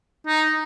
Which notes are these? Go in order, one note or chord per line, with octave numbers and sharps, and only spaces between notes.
D#4